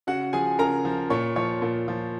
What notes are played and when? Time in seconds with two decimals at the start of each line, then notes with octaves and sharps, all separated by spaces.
0.07 C#3 F#4 F#5
0.33 F3 G#4 G#5
0.59 C#3 A#4 A#5
0.85 F3
1.10 A#2 C#5 C#6
1.36 F3 C#5 C#6
1.62 A#2
1.88 F3